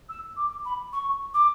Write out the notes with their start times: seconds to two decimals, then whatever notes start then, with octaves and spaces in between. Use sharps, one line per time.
0.09 E6
0.36 D6
0.65 B5
0.92 C#6
1.34 D6